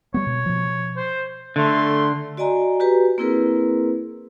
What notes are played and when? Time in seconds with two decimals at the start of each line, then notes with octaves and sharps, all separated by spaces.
0.14 G3 B3 C#5
0.26 B2
0.46 B2 F3
0.97 C5
1.56 D3 A3 C6
2.37 F#4 D5 D#5 G#5 A#5
2.80 F#4 G4 B4 A#5
3.18 A#3 C4 E4 G#4 A#4 B4